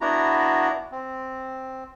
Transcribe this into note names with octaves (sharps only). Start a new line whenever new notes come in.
B3 D4 E4 F#4 A#5
C4